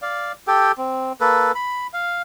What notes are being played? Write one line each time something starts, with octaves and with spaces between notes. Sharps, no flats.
D5 F5
G4 A4 G5
C4
A#3 A4 B4
B5
F5